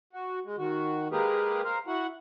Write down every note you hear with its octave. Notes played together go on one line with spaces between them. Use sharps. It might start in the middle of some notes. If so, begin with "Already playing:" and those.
F#4
G#3
D#3 F#4
G#3 A#3 G4 G#4 A#4 B4
A#4 C5 F5
E4 F#4 F#5